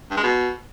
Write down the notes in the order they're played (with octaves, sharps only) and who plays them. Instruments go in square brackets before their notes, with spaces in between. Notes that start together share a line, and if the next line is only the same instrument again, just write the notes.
[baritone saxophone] G2
G#3
B2